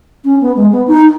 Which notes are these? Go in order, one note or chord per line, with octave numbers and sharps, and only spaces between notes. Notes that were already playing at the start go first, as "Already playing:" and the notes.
C#4
B3
G#3
B3
D#4